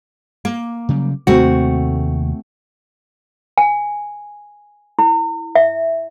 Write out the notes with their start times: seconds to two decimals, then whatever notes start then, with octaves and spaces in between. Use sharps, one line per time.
0.45 A#3
0.89 C#3 F#3 G3
1.27 D#2 C3 A3 C4 F#4
3.58 G#5
4.99 E4
5.55 E5